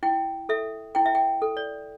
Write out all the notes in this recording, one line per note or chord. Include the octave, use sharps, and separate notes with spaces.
E4 G5
A4 E5
E4 G5
E5
G5
A4
D5